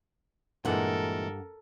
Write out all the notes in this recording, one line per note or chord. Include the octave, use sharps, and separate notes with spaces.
G2 A#2 E3 G#3 A4 A#4 F#5